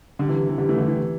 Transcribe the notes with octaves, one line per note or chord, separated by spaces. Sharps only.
D3 G3
C3 E3
C3 E3
D3 G3
E3 A3
D3 G3
C3 E3